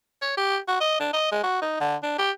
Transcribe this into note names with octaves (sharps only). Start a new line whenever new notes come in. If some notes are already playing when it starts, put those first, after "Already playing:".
C#5
G4
F#4
D#5
D4
D#5
G#3
F#4
D#4
D3
D4
G4